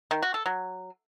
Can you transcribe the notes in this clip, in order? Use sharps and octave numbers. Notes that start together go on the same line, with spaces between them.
D#3
F#4
A4
F#3